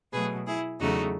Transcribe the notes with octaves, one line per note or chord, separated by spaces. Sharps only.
B2 F#3 A3 G#4 B4
E4 G#4
E2 C#3 F#3 A3 D#4 F#4